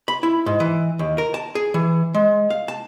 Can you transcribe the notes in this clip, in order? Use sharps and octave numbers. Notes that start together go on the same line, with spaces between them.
B5
E4
G#2
E3
D#2
A#4
A5
G#4
E3
G#3
F5
A5